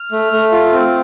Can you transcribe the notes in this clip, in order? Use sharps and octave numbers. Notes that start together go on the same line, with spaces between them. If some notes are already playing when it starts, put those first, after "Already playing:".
Already playing: F6
A3
A3
F4
C4